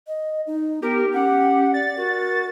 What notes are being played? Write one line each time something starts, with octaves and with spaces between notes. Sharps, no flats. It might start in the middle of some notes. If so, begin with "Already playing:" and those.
D#5
D#4
B3 G4 A#4
C#4 F#5
D5 A6
F#4 A#4